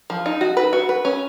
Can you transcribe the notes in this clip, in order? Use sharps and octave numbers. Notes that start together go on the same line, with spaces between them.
F3
D#4
F#4
B4
F#4
B4
C#4